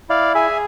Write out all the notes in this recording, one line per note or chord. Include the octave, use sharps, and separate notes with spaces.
E4 D5 F5
G#4 E5 G#5